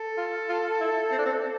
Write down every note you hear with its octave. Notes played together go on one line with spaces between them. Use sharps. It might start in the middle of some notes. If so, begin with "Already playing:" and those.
Already playing: A4
F4
F4
E4
C4
D4
C4